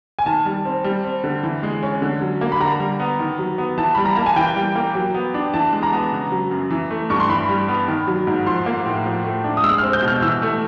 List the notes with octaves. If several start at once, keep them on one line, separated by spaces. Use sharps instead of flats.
G#5
D#3 A5
G3
C4
G3
C4
D3
E3
G#3
C#4
D3
F#3
A#3
B5
D3 A#5
G3
B3
D#3
F#3
B3
E3 A5
G3 B5
A#5
A#3 A5
G#5
E3 G5
G3
A#3
F#3
B3
D4
E3 A5
G#3
A#5
B3
C#3
F#3
F#2
E3
A3
G2 C#6
C6
E3 B5
G3
B3
D#3
F#3
G#2
F3 C6
A#3
A2
F3
A3
D4
D#6
G#3 E6
C4 F6
G6
B2
F6
E3 E6
A3